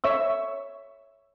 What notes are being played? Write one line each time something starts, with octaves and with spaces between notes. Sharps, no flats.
C#5 E5 C#6 E6